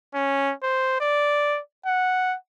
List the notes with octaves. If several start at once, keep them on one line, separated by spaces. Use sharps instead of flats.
C#4
C5
D5
F#5